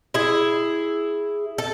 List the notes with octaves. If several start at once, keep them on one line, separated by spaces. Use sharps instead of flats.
E4 G#4
A4